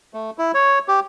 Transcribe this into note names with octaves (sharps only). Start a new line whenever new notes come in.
A3
E4
C#5
G4